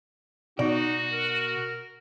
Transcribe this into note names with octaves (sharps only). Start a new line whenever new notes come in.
B2 D#4 F#4 D5
A#4